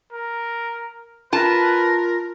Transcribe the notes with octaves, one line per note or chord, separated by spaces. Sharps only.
A#4
F4 A#4 B4 A5